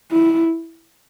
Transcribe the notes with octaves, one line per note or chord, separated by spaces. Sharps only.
E4